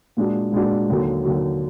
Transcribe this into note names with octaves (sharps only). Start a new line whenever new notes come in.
A#2 G#3 D4 F#4
A#2 G#3 D4 F#4
D#2 D3 F#3
D#2 D3 F#3